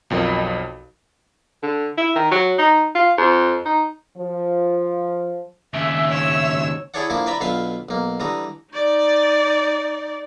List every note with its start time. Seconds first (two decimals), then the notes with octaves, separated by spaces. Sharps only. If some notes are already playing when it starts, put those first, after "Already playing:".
0.10 B1 F2 F3 A#4 D#5
1.63 D3
1.98 E4
2.15 D#3
2.31 F#3
2.58 D#4
2.95 F4
3.18 F2
3.65 D#4
4.17 F3
5.74 D#2 C#3 E5
6.09 C#5 E6
6.94 E4 G#4 A4 C#5 D5 F#5
7.10 D3 F3 A#3 E4 F4
7.26 B4 D5 E5 A#5 B5
7.40 B1 D3 F4 B4 E5 F5
7.89 B1 A#3
8.20 D3 E3 G3 A#5 D#6
8.73 D#4 D5